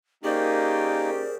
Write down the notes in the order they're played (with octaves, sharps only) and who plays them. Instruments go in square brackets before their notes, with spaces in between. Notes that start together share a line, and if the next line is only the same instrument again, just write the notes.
[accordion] A#3 D#4 [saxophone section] C#4 G4 [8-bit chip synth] G#4 A#4 C5 [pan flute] D5